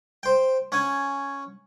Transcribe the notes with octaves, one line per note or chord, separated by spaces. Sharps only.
C5 G5
C#4 F#5 G#5